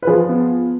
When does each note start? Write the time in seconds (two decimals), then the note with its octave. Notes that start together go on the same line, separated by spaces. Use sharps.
0.02 B4
0.07 F3 G#4
0.29 B3